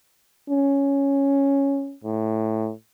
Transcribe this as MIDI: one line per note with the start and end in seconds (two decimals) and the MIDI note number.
0.50 1.95 61
2.04 2.72 45